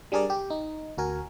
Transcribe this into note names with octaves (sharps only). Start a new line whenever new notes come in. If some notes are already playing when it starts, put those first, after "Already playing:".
G3 D4 G#4 A#4 D5
G4
D#4
D2 F#4 A#4 G#5